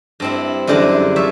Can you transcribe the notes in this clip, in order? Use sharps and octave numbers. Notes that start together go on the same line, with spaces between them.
G2 C4 E4
F#2 D3 E3 G3 G#3 D4
F3 C#5 E5